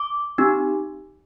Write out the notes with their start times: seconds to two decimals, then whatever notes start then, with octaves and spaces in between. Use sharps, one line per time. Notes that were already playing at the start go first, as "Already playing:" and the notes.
Already playing: D6
0.38 C4 D#4 G4